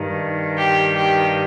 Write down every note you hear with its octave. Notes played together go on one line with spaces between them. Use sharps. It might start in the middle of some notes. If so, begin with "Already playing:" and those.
Already playing: G2 D#3
G4
G4